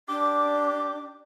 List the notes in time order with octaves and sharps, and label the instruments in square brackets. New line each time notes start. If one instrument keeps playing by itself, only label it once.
[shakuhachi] D4 [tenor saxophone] G4